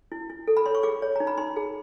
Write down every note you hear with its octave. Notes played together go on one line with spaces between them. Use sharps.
E4
E4
A4
B5
C#5 C6
C#6
G#4 D6
C#5
D#4 A#5
B5
D#4 C6
G#4